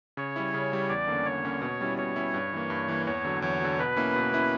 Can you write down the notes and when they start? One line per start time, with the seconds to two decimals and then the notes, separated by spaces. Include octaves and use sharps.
0.17 C#3 C#5
0.36 G3 C#4 E4
0.54 C#3
0.72 G3 C#4 E4
0.89 E2 D5
1.07 D3 A#3 C#4
1.25 E2 C#5
1.45 D3 A#3 C#4
1.62 B2
1.81 G3 C#4 E4
1.98 B2 C#5
2.16 G3 C#4 E4
2.34 G2
2.53 E3 A#3
2.70 G2
2.88 E3 A#3
3.06 E2 C#5
3.25 D3 F#3
3.42 E2 C#5
3.61 D3 F#3
3.79 B2 B4
3.97 A#3 C#4 E4
4.15 B2
4.33 A#3 C#4 E4